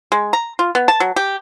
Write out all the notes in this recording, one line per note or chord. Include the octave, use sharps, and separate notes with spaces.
G#3
A#5
F4
B3
A5
F#3
G4